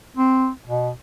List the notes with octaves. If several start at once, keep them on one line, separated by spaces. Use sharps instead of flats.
C4
B2